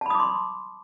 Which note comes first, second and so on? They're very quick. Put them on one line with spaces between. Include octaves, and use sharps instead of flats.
A5 B5 D#6 D6 C6